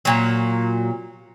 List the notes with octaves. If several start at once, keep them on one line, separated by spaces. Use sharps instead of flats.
A#2 F#3